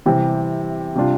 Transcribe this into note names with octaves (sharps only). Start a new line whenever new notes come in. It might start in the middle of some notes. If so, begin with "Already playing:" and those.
C3 E3 G3 C4 G4
C3 G3 D4 F4